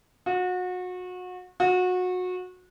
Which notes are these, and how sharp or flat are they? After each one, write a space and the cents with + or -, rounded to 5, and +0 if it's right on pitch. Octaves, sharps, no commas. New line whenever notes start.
F#4 -30
F#4 -25